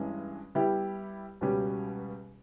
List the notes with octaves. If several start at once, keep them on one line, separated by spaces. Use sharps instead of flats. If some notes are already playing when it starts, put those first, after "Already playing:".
Already playing: G2 E3 G#3 C#4
G3 B3 E4 G4
C#2 B2 G3 C#4 G4